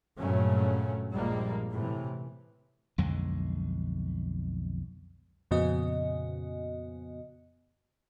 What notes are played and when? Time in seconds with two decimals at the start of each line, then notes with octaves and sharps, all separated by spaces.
0.19 G2 A#2 C#3 F#3 A3 C#4
1.12 A#1 F3 G3 G#3 A#3
1.72 A2 C3 E3
2.98 B1 F2 D3 G#3
5.51 F2 A#2 C#3 B3 F#4 D#5